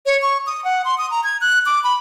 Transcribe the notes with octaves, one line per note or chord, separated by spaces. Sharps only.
C#5
C#6
D#6
F#5
C6
D#6
A#5
G#6
F#6
D6
B5